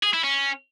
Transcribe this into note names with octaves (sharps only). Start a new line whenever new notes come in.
G#4
E4
C#4